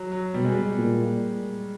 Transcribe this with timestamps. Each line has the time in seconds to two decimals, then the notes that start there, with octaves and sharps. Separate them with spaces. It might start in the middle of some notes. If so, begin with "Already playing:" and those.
Already playing: F#3
0.12 F#3
0.34 B2 G3
0.45 G#3
0.55 G3
0.78 A#2